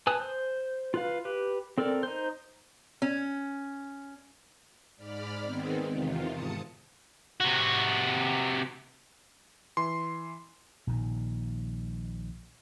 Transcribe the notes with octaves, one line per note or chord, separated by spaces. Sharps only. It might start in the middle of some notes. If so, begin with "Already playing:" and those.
B4 G#5 A5 D#6
C5
F4 B4 F5
G4 B4
C4 A4 A#4 D5
D#4 C5
C#4
G#2 D5 B5 F6
D#3 G#3 B3 C4
E2 C3 D#3 F4
G#2 A5 D#6 C#7
C3 F#4
E3 C6
A#1 A#2 D#3